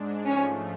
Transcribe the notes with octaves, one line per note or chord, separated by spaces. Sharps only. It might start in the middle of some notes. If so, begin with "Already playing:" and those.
Already playing: G#2 G#3 D4
G#2 F3 A3 C#4